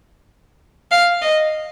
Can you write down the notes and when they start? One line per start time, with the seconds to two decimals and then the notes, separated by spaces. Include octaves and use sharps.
0.91 F5
1.22 D#5